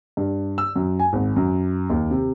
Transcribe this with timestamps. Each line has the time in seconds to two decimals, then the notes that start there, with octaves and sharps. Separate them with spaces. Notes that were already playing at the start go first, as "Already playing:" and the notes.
0.17 G2
0.58 E6
0.76 F#2
1.00 G#5
1.13 G#1
1.36 F#2
1.90 D#2
2.11 C3